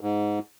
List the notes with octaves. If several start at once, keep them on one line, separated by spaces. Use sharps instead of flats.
G#2